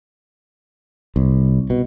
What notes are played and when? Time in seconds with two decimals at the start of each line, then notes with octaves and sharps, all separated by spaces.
1.16 C2
1.70 B2